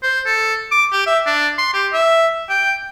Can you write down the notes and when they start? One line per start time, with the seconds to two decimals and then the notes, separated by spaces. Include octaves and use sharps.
0.03 C5
0.26 A4
0.71 D6
0.92 G4
1.07 E5
1.26 D4
1.58 C6
1.73 G4
1.93 E5
2.49 G5